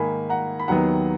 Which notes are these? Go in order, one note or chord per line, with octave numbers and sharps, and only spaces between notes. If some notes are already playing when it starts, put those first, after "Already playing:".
Already playing: G#2 D#3 A#3 G#5 B5
F#5 A#5
B5
D#2 D#3 F#3 B3 F#5 A#5